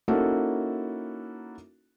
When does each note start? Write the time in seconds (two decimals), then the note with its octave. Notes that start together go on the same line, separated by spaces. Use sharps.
0.08 A#3 C#4 D#4 E4 F#4 A4